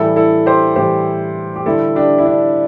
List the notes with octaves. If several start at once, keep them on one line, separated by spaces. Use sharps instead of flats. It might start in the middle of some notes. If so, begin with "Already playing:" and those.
Already playing: A2 E3 G3 E4 A4
E4 A4
G4 C5
A2 E3 G3 G4 C5
G4
G2 D3 G3 E4 A4
D4 G4
E4
D4